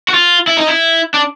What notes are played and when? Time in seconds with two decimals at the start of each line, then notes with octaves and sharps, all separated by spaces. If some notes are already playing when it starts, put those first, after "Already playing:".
0.09 F#4
0.14 F4
0.47 E4
0.57 D#4
0.68 E4
1.14 D4